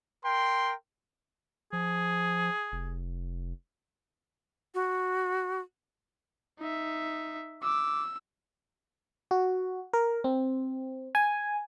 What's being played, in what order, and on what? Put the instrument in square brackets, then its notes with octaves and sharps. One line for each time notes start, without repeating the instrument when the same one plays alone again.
[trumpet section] A#4 G5 C6
[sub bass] F3 [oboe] G#4
[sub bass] F1
[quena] F#4
[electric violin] D#4 E5
[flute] D6 [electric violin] E6
[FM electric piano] F#4
A#4
C4
G#5